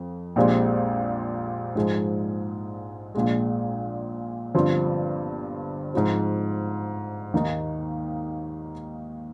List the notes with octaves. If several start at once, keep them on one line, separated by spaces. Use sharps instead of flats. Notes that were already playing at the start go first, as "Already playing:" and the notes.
Already playing: F2
A#1 A#2 G#3 C4 G4
G#2 F3 G#3
A#1 A#2 G#3
G1 G2 F3 C4 F4
G#2 F3 C4
D#2 D#3 A#3 D#4